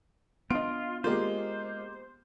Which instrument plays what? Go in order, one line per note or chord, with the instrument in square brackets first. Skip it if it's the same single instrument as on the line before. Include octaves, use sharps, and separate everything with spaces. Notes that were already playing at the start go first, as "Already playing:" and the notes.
[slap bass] B3 D4 [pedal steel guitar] F4 [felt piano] D#5 D7
[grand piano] G#3 F4 [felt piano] A#3 G4 [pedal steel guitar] C5